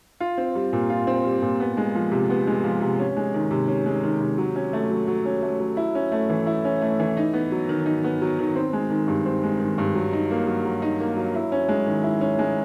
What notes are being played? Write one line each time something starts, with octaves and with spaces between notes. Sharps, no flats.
F4
C4
G3
A#2
F4
C4
G3
A#2
B3
G#3
F3
C3
B3
G#3
F3
C3
C#4
G#3
D#3
C3
C#4
G#3
D#3
C3
F#3
C#4
A3
F#3
F#3
C#4
A3
F#3
E4
C#4
A3
E3
E4
C#4
A3
E3
D#4
B3
F#3
D#3
D#4
B3
F#3
D#3
C4
G#3
D#3
G2
C4
G#3
D#3
G2
F#3
D#4
A#3
F#3
F#3
D#4
A#3
F#3
E4
C#4
G#3
D#3
E4
C#4
G#3